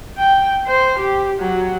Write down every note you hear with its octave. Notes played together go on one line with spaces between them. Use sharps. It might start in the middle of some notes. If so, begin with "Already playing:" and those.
G5
C5
G4
F#3